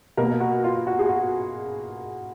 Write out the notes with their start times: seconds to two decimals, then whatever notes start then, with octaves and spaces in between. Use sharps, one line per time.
0.17 B2 A#3 A#4
0.40 F#4
0.64 F4
0.87 F#4
0.99 G#4
1.09 F#4